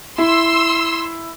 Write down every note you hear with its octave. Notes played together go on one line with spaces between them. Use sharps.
E4 C6 E6